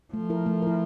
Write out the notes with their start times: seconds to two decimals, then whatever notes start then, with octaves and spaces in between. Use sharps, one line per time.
0.13 F3 A3
0.30 E4 A#4
0.46 A3
0.62 E4 A#4